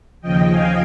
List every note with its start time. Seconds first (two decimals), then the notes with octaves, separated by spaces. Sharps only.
0.21 D#2 C#3 F3 D#5 G5
0.49 F5 G#5